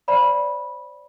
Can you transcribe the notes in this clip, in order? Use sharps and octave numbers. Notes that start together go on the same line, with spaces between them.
C5 D5 F5 A5 B5